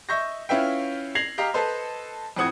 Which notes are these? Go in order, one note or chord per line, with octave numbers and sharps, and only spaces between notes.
D#5 E5 C#6 G6 A#6
C#4 E4 F4 B4 E5 G5
G#6 A#6 C7 F7 F#7
G4 D#5 F5 A#5
A4 B4 C5 D#5
F2 A2 C4 F#5 D#6 G#6